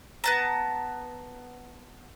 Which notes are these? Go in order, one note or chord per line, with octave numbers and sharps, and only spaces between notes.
B3 A5 A#5